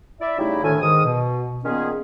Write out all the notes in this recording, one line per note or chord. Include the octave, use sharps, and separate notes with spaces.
E4 D5 E5
C#3 G3 A3 D#4 E4
D2 A2 D3 D#3 A4 G#5
G#2 D#3 D#6
B2
A#2 D#3 B3 C#4 F4 G#4